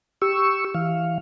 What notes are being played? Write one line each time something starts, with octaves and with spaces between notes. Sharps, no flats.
G4 C#6 E6
E3 F5